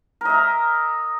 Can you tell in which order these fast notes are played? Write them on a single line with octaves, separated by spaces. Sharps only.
A#4 D#5 E5 A#5